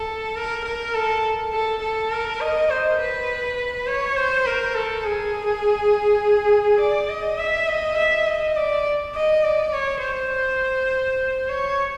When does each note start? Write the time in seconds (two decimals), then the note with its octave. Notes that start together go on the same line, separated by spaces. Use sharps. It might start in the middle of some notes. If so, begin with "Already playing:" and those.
Already playing: A4
0.36 A#4
0.65 A#4
0.94 A4
1.53 A4
1.82 A4
2.11 A#4
2.41 D#5
2.70 C5
2.99 B4
3.87 C#5
4.16 C5
4.46 A#4
4.74 A4
5.04 G#4
6.80 D5
7.09 D#5
7.38 E5
7.68 D#5
7.97 E5
8.26 D#5
8.56 D5
9.15 D#5
9.44 D5
9.73 C#5
10.02 C5
11.49 C#5